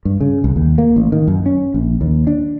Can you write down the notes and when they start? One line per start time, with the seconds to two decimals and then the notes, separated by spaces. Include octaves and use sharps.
0.05 G2
0.21 C#3
0.44 C2
0.56 D#2
0.78 A#3
0.96 A1
1.12 D#3
1.28 F#2
1.46 C#4
1.74 A#1
2.01 D#2
2.27 D4